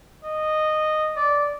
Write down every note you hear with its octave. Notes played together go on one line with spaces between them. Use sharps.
D#5
D5